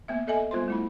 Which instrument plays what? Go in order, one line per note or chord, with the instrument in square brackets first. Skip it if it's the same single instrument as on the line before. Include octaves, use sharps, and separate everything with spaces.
[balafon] A#3 B3 E5
A4 D#5 E5 G#5
G3 B3 F4 C5 C6
A3 E4 B5